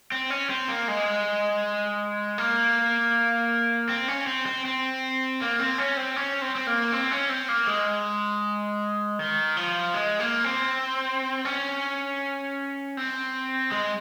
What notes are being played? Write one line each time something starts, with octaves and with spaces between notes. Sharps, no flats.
C4
C#4
C4
A#3
G#3
A#3
C4
C#4
C4
C4
C4
A#3
C4
C#4
C4
C#4
C4
C4
A#3
C4
C#4
C4
A#3
G#3
D#3
F3
G#3
A#3
C4
C#4
C4
G#3